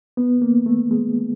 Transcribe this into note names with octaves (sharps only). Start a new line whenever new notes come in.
B3
A#3
A3
G#3